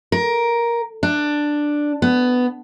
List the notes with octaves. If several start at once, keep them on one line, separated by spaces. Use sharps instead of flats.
A#4
D4
B3